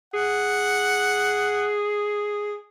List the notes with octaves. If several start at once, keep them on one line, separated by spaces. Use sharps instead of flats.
G#4 F#5